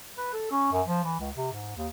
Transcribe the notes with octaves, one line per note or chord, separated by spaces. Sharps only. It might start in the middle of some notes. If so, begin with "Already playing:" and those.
B4
A4
C#4
F#2
F3
E3
C#2
C3
G#2
D#2